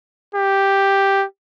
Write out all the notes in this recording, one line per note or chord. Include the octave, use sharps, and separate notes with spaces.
G4